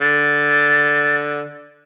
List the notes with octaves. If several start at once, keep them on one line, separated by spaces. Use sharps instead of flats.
D3 A6